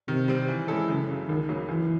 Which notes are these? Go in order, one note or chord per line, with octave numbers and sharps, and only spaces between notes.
C3 D#3
G3 C4
E3
G#3 C#4 E4 A4
F#2 C#3
C#3 F#3
C#2 D#3
C#3 F#3 A#3
F#2 E3